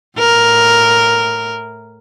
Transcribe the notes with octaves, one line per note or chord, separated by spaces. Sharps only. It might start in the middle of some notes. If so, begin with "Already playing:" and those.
A2 A#4